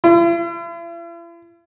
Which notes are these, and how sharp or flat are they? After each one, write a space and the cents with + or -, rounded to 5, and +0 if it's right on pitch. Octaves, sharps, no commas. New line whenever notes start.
E4 +45